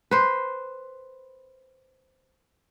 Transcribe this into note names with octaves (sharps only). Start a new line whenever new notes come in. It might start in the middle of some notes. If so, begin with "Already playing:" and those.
B4 C5